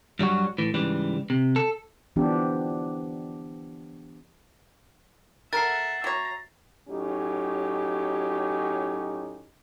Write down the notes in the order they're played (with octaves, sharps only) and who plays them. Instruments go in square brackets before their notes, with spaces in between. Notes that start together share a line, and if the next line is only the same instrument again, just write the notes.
[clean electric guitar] G2 F#3 G3 F#4
A2 E3
G#2 C#3 E3 G3
C3
A4
[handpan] E3 F3 B3 D4 G4
[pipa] A4 A#4 [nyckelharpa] E5 F#5 [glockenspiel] A6 C7
[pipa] F#3 C#5 [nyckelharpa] A#5
[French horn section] A2 F#3 C#4 D#4 G4